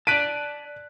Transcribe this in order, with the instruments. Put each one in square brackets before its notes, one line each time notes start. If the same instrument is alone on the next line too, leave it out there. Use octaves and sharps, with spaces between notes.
[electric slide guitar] D5 A5 [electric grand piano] F#6 B6 D#7 [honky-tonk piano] D7